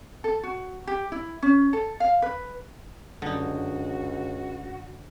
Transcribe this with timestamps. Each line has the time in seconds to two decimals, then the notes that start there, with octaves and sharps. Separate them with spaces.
0.24 A4
0.43 F#4
0.87 G4
1.12 E4
1.43 C#4
1.73 A4
2.00 F5
2.22 B4
3.22 C#2 F#2 D3 D#4 F#4